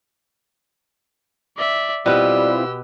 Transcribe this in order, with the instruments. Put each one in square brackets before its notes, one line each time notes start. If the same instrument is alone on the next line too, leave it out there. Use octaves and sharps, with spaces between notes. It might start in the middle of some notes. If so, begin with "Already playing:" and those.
[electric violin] D5 E5
[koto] B2 B3 [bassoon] G3 [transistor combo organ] C4 E4 F4 [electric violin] G4 E6